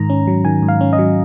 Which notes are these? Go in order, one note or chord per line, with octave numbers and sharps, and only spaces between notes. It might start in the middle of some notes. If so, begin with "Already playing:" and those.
Already playing: G#2 D#3 A#5
C#4
F#3
D#3 G#5
G#2
F5
C#4
D#5
F#3